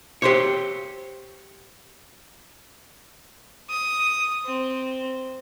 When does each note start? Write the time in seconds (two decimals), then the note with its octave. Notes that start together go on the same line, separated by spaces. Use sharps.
0.22 G4 C5 C#5
3.69 D#6
4.45 C4